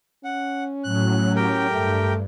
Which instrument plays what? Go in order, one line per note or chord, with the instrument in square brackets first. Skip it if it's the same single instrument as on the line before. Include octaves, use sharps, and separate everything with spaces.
[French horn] C#4 [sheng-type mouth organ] F#5
[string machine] A2 F#3 [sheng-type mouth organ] F#6
[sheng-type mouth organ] G4 A#4 G5
[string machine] G2 [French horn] A3